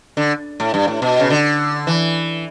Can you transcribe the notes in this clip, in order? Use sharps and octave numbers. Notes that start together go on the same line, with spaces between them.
D3
A2
G2
A2
B2
C#3
D3
E3